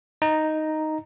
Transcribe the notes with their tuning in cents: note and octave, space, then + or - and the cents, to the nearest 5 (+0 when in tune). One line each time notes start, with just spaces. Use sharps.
D#4 +0 A#5 +0